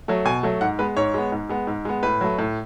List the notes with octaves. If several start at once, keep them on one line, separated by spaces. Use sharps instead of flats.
F#3 A3
B2 G#5
F#3 A3
G#2 F#5
G#3 B3 B4
G#2 C#5
G#3 B3
G#2
G#3 B3
G#2
G#3 B3
A2 B4
F#3 A3
A2